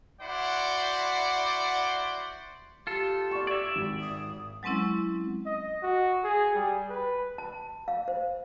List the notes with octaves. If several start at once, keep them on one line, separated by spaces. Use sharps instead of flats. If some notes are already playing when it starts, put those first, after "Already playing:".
E4 F#4 C5 D5 F#5
F4 G4 A4
D5 C#6
D5 E5 G#6
G#1
D#6
F#3 G#3 C4 C#4 E4
D#5
F#4
G#4
G3
B4
A5
F5
C5